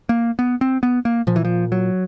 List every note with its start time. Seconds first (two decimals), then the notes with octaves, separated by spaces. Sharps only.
0.09 A#3
0.39 B3
0.61 C4
0.83 B3
1.05 A#3
1.27 A#2 F3
1.36 E3
1.45 F3
1.72 F#3